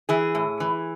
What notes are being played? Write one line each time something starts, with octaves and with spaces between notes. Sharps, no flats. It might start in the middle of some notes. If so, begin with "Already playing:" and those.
E3 G#4
A2
E3